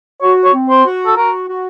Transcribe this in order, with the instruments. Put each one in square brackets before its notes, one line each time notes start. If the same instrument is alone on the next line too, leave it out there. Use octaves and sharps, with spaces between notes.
[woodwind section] F#4 [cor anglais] C#5
[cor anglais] C#5
[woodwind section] C4
[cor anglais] C5
[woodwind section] F#4
[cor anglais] A4
[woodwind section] F#4 [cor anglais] A#4
[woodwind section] F#4